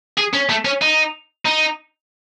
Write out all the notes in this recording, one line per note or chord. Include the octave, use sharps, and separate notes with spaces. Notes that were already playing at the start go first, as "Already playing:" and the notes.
G#4
C#4
A3
C#4
D#4
D#4